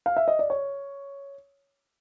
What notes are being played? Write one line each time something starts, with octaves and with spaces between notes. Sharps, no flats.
F5
E5
D#5
D5
C#5